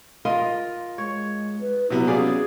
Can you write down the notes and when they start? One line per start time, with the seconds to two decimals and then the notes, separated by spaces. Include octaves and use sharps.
0.25 F4 A#4 D#5
0.98 G#3 C#5
1.61 B4
1.90 C3 F#3 B3 E4
2.07 C#4 G#4 D5 F5